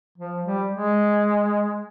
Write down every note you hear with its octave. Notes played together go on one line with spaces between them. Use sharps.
F3
G3
G#3